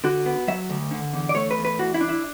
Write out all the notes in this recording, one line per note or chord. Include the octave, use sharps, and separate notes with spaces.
D3 F#4
B3
F#3 E5
D2
D3
E2
D5
A3 C#5
B4
E2
B4
E3 F#4
E4
D4
E4